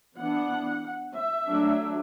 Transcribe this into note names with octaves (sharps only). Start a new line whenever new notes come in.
E3 B3 D4 F#5
E5
F#3 A3 D4